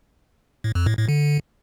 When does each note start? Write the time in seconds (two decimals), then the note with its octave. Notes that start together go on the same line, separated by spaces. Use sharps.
0.64 A2
0.75 F2
0.86 A2
0.97 A2
1.09 D3